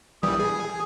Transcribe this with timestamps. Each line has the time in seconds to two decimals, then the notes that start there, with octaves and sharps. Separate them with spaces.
0.23 A#1 E3 G3 D#6
0.39 G#4